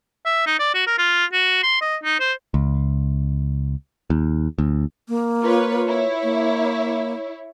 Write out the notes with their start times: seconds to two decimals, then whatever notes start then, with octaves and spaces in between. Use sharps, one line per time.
0.26 E5
0.46 D#4
0.59 D5
0.74 F#4
0.87 A#4
0.98 F4
1.33 F#4
1.63 C6
1.81 D#5
2.04 D#4
2.20 C5
2.54 C#2
4.10 D#2
4.58 D2
5.09 A#3
5.43 F4 B4 C#5
5.88 E4 C#5
6.23 A#3